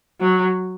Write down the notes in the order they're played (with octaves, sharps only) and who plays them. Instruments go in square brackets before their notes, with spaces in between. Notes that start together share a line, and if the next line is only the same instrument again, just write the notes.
[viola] F#3